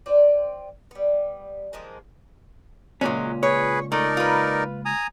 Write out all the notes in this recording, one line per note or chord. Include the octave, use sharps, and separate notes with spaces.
C4 F4 D5
G3 B3
D#3 F3 G#3 A#3
C#2 A#2 F#3 G#3 C#4
G#4 B4 C#5
A3 D#4 A#4 D5
F4 B4
G#5 A#5 D#6